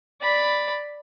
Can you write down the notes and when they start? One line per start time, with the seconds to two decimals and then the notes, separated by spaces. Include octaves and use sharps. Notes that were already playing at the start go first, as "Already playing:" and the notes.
0.22 D5 B5